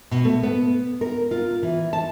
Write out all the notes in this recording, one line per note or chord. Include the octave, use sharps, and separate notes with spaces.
B2
A3
B3
A#4
F4
E3
A5